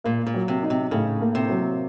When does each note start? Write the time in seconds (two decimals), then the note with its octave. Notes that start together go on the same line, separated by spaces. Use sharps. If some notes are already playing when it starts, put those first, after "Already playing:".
0.04 A#2 A#3
0.26 A#2
0.34 F#3
0.48 C3
0.63 D#4
0.70 C3
0.91 A2 C#3
1.21 A#3
1.35 C3
1.50 F#3